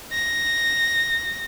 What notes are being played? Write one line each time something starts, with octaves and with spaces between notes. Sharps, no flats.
A#6